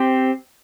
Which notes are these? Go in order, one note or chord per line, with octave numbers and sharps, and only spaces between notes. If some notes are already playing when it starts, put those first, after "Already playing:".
Already playing: C4 G4 C5